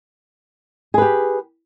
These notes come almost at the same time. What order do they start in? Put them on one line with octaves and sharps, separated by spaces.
G#4 B4 G4